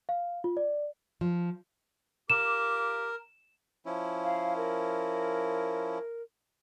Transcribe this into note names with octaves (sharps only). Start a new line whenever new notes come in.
F5
F4
D5
F3
F4 G4 A#4 D6 E7
F3 C#4 E4
F5
A#4